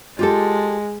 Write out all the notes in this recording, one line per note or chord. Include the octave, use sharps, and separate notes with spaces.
G#3 F4 G4 A4